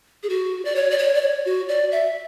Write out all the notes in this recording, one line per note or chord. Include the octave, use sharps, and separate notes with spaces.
G#4
F#4
D5
C#5
D5
C#5
D5
C#5
F#4
D5
E5